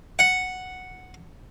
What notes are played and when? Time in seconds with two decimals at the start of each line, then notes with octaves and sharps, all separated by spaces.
0.19 F#5